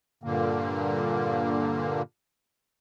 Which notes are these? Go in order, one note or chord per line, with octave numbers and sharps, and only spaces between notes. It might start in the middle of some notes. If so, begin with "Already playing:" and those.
G2 A#2 D3 A#3